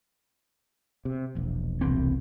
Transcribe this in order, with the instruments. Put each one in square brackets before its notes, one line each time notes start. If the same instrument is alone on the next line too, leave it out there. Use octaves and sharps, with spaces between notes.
[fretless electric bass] C3
E1 A#1
[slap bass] C2 E3 C4